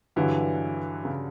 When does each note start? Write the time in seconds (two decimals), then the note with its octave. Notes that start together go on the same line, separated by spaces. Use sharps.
0.16 G2 D3 E3 F#3
1.05 C#3